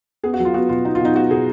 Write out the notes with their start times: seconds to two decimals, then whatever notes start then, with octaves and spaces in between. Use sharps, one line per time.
0.24 B3 G#4
0.34 F#4
0.40 F#3
0.45 F4
0.54 B3 F#4
0.69 B2 F4
0.84 B3 D#4
0.95 F4
1.00 B2 D#4
1.15 B3 F#4
1.30 B2 G#4